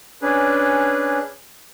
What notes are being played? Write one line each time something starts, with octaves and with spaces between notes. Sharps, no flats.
C#4 D4 G#4 B4